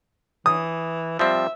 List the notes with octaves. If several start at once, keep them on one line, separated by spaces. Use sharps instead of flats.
E3 D#6
F3 G3 C4 E5